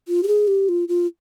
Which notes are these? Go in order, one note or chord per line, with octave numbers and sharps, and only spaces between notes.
F4
G4
G#4
G4
F4
F4